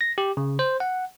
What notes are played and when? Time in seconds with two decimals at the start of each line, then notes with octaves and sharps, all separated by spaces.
0.01 A#6
0.18 G4
0.37 C#3
0.59 C5
0.80 F#5